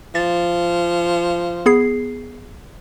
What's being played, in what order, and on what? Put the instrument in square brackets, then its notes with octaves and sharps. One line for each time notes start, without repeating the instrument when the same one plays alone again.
[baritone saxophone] F3 [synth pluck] A6
[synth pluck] B3 G#4 C7